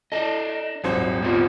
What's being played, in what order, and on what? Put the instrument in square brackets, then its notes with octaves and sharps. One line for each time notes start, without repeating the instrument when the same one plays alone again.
[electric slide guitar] D4 D#5 [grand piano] A4
[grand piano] D#1 G#1 C4 [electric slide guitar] F#3
[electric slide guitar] B3 F4